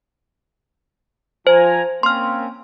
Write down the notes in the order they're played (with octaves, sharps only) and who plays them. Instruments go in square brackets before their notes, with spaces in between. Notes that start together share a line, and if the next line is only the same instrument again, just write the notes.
[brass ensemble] F3 G#5 A#5 [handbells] C5
[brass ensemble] A#3 C4 C#4 [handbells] C6 F6